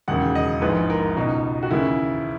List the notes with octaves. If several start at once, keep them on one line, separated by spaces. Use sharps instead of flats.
E1 D#2 C#3 F#5
D#5
A#1 G#2 E3 B4
A#4
C#2 B2 D#4
F#4
D#2 C#3 E3 E4